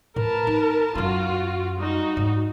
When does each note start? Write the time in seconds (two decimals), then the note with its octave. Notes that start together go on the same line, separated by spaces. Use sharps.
0.16 A2 A#4 B4 A5
0.47 D#4
0.95 F#2 C#4 F4 F#4
1.75 G3 D#4 F#4
2.17 G#2